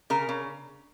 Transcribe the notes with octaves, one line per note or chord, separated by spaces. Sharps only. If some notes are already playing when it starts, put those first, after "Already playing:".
C#3 A#4
C#3